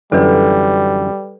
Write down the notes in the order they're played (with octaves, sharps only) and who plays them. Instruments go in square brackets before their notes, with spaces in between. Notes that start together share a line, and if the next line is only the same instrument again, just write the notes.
[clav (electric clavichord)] F#2 D3 E3 [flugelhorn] G3 [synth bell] A4 B4